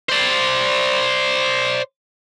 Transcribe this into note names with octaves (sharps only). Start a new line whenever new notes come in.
C5 D5